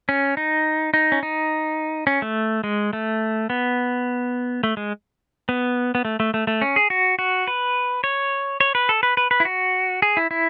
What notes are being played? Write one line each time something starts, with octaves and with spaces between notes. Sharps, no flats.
C#4
D#4
D#4
C#4
D#4
C#4
A3
G#3
A3
B3
A3
G#3
B3
B3
A3
A3
A3
A3
C#4
G#4
F#4
F#4
B4
C#5
C#5
B4
A4
B4
B4
B4
E4
F#4
G#4
E4
E4